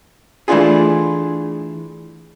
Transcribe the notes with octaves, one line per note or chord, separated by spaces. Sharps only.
E3 A3 D4 F4 G#4